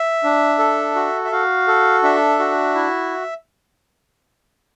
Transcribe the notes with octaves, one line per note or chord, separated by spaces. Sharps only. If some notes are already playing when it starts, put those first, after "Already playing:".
Already playing: E5
D4
A4
F#4
E5
F#4 F5
A4
D4 E5
F#4
E4